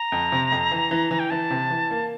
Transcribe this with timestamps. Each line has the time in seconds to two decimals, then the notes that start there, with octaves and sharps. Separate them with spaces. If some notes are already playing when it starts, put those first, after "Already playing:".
Already playing: A#5
0.12 F2
0.32 C3
0.52 F2
0.71 E3
0.91 E3
1.11 E3
1.19 G5
1.30 E3 A5
1.51 C3
1.70 E3
1.91 A#3